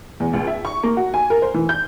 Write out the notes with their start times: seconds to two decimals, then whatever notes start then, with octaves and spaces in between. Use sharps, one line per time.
0.20 E2
0.33 C#2
0.47 E5
0.65 C#6
0.83 A#3
0.97 F#4
1.14 G#5
1.30 A#4
1.42 C5
1.54 E3
1.69 G6